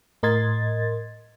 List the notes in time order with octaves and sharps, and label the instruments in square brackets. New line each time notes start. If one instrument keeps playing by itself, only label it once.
[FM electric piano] A2 A#4 D#5 C6 G#6 A6